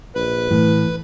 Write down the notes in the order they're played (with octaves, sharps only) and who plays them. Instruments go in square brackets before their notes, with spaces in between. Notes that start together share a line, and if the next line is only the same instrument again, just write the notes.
[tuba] A#1 [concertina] B4
[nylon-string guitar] A2 [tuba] E3